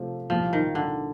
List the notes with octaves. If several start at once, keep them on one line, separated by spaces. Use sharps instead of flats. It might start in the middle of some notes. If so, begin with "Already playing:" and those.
Already playing: C3 F3 A3 C4 F4
C2 A#2 F3 G3 A#3
D#3
D3